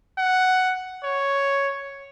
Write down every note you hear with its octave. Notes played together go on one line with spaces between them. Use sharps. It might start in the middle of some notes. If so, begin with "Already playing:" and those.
F#5
C#5